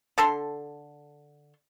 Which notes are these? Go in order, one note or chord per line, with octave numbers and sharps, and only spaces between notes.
D3 A4 A5 C6